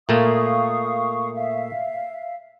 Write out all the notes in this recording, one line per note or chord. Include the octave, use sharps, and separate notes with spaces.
A#2 A3 A#3 F5 C#6 D#6
E5 F5